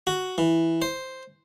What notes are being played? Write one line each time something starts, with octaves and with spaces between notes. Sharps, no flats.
F#4
E3
C5